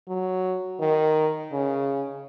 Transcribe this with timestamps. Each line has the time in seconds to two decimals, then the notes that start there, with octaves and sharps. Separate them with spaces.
0.08 F#3
0.80 D#3
1.52 C#3